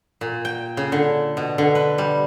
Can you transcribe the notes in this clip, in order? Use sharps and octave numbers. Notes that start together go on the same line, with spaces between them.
A#2
G5
C#3
D3
B2
D3
B4
G3